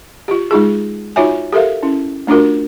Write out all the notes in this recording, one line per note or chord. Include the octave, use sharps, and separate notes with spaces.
F4 G4
G#3 D#4 F4 G#4
D#4 F4 F#4 C#5 E5 G#5
G4 A4 A#4 E5 F5
C#4 E4
A3 D4 F4 F#4 A#4